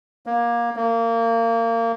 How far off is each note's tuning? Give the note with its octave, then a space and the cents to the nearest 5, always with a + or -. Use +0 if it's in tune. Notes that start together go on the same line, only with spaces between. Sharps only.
A#3 +20
A#3 -25